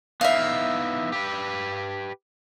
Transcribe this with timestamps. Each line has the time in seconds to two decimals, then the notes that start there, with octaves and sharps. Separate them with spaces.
0.21 B3 D#4 E4 E5 F5
1.12 G4 B4